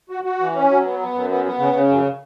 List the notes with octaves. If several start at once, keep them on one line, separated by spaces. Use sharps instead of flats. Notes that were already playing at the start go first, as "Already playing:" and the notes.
F#4
F#4
E3
C#4
F#3
B3
B3
F#2
B3
B3
C#3
C#3
F#2